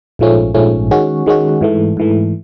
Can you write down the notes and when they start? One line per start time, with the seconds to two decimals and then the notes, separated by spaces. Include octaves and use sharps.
0.19 A#1 G#2 F3 A3 C#4
0.54 A#1 G#2 F3 A3 C#4
0.91 D#3 G#3 C#4 F#4
1.26 D#3 G#3 C#4 F#4
1.61 G#2 E3 A3
1.97 G#2 E3 A3